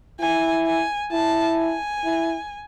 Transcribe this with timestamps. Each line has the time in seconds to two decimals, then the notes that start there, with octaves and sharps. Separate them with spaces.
0.20 E4 G#5
0.65 G#5
1.12 E4 A5
1.58 G#5
2.05 E4